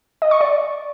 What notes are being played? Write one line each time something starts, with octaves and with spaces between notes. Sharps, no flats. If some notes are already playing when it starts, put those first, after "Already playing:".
D#5
C#6
D5